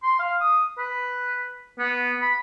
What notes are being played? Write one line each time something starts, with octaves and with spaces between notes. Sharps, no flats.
C6
F5
D#6
B4
B3
B5